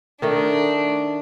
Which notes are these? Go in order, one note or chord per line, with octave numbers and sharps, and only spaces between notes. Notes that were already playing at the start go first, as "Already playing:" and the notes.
D#3 A3 D4 D#4